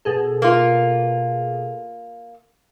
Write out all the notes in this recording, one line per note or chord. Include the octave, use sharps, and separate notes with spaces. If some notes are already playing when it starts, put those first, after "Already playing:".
B2 G#4 A4
A#3 F4